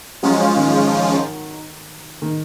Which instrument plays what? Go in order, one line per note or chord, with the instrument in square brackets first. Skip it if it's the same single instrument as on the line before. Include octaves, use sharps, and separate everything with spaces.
[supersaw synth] F3 G#3 C#4 F4 [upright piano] F#3
[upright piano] D#3
D#3